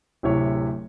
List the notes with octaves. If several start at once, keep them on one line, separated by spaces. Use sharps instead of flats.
D1 C3 E4 C#5